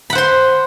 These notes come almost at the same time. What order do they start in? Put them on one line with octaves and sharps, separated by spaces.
B5 F#5 C5 C6